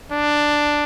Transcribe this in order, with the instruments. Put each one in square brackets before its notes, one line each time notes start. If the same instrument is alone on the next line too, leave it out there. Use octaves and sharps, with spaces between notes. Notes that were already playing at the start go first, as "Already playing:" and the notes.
[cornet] D4